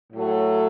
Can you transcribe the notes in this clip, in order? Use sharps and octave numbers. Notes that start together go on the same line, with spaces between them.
A2 F#3 A3